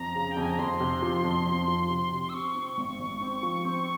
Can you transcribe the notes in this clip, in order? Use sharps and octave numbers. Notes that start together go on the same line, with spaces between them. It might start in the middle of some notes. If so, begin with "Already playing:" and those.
Already playing: F2 A#5
C#3
G5
F2 G#5
A#5
F2 C6
C3
F3
F2
F2
F3
C3
C3
E6
C4 C#6
C4
G#1
G#1
C4
F3
C4